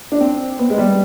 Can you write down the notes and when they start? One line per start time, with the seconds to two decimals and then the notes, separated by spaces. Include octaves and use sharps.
0.12 D4
0.21 C4
0.59 B3
0.70 G#3
0.78 G3